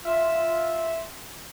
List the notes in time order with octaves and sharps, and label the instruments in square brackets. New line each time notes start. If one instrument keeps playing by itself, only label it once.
[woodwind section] F4 E5